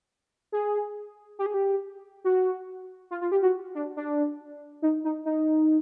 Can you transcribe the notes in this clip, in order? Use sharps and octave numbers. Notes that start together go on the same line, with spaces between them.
G#4
G4
G#4
G4
F#4
F4
F4
G4
F#4
D4
D4
D#4
D#4
D#4